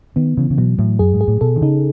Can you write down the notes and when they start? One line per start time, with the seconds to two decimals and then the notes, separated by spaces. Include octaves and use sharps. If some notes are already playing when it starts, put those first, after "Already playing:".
0.16 D#3 B3
0.37 C#3 E3
0.50 C#3
0.58 B2 F#3
0.79 A2 F#3
0.99 F#2 G#4
1.13 G#2
1.21 G#4
1.28 A2
1.41 B2 A4
1.56 D#3
1.62 C#3 D#4